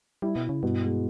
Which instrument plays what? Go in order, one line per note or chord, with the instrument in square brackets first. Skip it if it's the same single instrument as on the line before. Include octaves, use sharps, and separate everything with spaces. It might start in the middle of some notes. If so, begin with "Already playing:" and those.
[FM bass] G3 [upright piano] E4
[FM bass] B2
[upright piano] E4
[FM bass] C#3
[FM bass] G2 [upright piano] B2
[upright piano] G#3